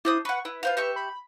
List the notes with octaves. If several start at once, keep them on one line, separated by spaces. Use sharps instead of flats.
D4 E4 C5 D#6
B4 F#5 C#6
E4 B4
F4 C5 F5
G4 E5 C#6
B5